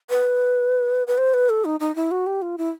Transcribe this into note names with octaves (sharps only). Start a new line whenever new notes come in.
B4
B4
C5
B4
A4
D#4
D#4
E4
F#4
G4
F4
E4